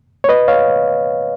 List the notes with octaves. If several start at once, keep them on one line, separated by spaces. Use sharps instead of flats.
C#5
B4 D#5
C#5 F5